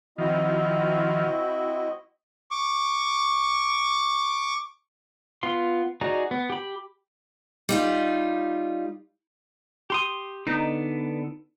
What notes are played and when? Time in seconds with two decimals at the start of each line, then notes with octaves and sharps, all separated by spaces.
0.18 D#3 F3 C4 E4 F#4 D#5
2.51 C#6 D6
5.43 B3 F4 C6
6.01 D#4 F#4 G#4 D5 A#5
6.31 B3
6.50 G4 B5
7.69 G3 D#4 F4
9.90 G4 C6 D#6
10.47 D3 B3 D#4